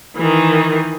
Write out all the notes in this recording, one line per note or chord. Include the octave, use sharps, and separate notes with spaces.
D#3 E3